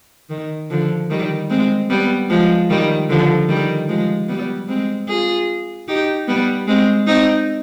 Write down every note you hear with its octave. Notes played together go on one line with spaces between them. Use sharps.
D#3
D3 F3
D#3 G3
G#3 C4
G3 B3
F3 G#3
D#3 G3
D3 F3
D#3 G3
F3 G#3
G3 B3
G#3 C4
F4 G#4
D#4 G4
G3 B3
G#3 C4
C4 D#4